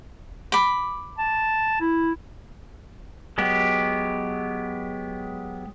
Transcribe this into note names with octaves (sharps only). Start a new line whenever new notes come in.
B5 D6
A5
E4
F#3 G#3 B3 G4